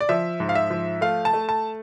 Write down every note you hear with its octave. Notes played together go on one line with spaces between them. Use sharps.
D5
F3 E5
G#2
F5
E5
F3
A3 F5
A5
A3
A5